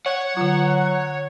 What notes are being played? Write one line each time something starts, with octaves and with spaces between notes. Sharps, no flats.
C#5 F#5
D3 F#3 F4